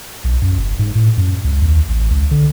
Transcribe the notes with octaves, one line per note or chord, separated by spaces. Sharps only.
B1
F#2
F#1
G#2
A2
F#2
C#2
D#2
A1
C#2
D3